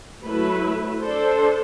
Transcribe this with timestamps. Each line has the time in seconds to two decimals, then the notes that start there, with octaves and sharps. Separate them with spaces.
0.22 F#3 A3 E4 B4
0.99 D4 A4 C5